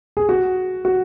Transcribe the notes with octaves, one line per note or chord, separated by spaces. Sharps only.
G#4
F#4
F#4